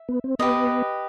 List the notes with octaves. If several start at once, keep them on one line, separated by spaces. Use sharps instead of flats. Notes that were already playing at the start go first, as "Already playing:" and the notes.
Already playing: E5
B3
C4
B3 G4 B4 D#5